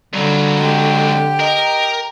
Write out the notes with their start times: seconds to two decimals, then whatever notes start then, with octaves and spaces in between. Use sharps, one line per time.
0.14 F2 D3 F#3 G3
0.60 G#3 G4
1.40 A#4 D#5